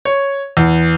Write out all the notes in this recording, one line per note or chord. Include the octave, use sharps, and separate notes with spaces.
C#5
E2